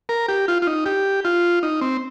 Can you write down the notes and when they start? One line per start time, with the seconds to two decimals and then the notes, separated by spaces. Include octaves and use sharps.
0.09 A#4
0.28 G4
0.48 F4
0.62 F4
0.67 D#4
0.86 G4
1.25 F4
1.63 D#4
1.81 C4